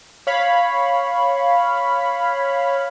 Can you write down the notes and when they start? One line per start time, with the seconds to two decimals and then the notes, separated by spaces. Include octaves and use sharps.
0.27 C#5 F5 B5